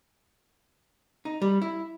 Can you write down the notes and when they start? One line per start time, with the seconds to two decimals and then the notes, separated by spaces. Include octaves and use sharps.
1.25 D#4
1.42 G3
1.62 E4